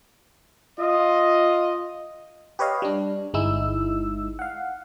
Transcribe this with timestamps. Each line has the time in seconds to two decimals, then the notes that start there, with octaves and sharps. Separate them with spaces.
0.79 F4 D#5
2.59 G4 B4 C#5 D#5 F5
2.82 G3 D4
3.34 G1 G#3 D#4 E4 E6
4.39 F5 F#5